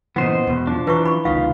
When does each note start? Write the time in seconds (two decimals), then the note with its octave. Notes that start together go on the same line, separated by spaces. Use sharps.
0.16 A#2 C#3 E3 B3 C5 D#5
0.47 E2 B2
0.67 F3 D4
0.87 E3 B4 A#5 C#6
1.05 B5 C#6
1.25 F1 C#2 D#3 F4 F5